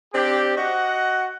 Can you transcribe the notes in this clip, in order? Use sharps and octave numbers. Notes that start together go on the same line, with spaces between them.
C4 D4 G4
F#4 D#5 F#5